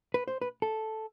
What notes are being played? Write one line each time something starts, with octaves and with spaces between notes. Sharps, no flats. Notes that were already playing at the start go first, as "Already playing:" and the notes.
B4
C5
B4
A4